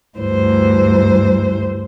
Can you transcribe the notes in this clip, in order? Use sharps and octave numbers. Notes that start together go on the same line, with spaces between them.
D2 G2 E3 C5